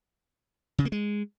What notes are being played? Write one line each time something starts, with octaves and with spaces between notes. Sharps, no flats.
C#3
A#3
G#3